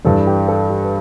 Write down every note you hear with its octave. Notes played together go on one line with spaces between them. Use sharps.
G2 E3 G3 A4
G4
A4
G4
B4